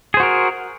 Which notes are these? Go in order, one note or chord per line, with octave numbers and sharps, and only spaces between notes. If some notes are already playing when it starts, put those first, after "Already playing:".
F#4 G#4 A#4 C5